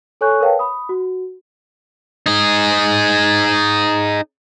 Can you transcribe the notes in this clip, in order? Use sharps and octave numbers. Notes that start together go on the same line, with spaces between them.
A4 C#5 G#5 C#6 F#6 G6
A#4 B4 C#5 F5 G5 A5
B5 D#6
F#4
D#4 G#4